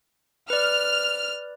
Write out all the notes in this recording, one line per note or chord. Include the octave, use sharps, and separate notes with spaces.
B4 D5 F6